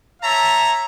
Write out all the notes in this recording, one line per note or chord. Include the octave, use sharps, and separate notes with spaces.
C#5 E5 A5 A#5